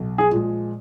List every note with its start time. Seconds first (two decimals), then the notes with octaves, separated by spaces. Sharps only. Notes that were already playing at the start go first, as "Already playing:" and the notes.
Already playing: B1
0.18 G#4
0.31 A#2 F3 G#3